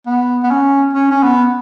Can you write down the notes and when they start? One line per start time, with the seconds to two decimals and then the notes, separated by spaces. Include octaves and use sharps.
0.06 B3
0.43 B3
0.51 C#4
0.93 C#4
1.11 C#4
1.23 B3